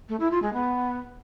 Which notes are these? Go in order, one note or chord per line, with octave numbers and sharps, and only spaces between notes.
A3
E4
F4
G#3
B3